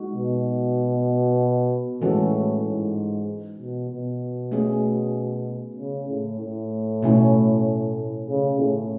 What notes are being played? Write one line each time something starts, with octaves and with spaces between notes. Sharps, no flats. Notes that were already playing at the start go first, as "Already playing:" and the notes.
Already playing: G#3 D#4 F#4
B2
A2 E3 G#3 C#4 F#4 A4
G#2
B2
B2
A3 C#4 G#4
C#3
A2
A2
B2 A3 C#4 E4
C#3
A2